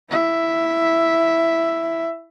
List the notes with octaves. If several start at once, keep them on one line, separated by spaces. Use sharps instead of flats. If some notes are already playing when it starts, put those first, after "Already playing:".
E4 E5